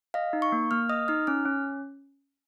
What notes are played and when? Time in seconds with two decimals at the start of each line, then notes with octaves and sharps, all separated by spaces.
0.14 D#5 F5
0.33 D#4
0.42 C#6
0.52 A#3
0.71 A#3 F6
0.89 D#5 D#6
1.08 D#4 F6
1.27 C#4 F6
1.45 C#4